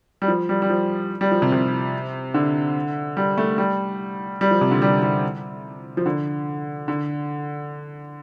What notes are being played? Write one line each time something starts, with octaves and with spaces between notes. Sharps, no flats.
G3
F3
G3
G3
F3
G3
F3
C3
C3
D3
G3
A3
G3
G3
F3
C3
D3
G3
G3
F3
D3
D3